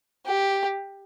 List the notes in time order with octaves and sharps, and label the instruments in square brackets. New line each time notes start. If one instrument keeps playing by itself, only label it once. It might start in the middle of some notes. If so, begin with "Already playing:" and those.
[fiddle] G4